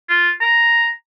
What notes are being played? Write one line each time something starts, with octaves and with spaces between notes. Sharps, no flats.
F4
A#5